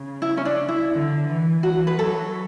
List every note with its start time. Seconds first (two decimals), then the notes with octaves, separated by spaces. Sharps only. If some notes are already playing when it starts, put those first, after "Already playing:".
Already playing: C#3
0.22 E4
0.37 C#4
0.45 D4
0.69 E4
0.92 D3
1.28 E3
1.63 E3 F#4
1.87 B4
1.99 F#3 A4